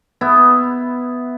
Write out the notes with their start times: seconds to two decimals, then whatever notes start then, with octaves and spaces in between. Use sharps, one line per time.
0.21 B3 E4